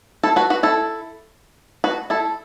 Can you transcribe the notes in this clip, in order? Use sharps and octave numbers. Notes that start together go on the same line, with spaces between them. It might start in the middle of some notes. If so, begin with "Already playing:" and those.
E4 A4
F#4 B4
F#4 B4
E4 A4
F#4 B4
E4 A4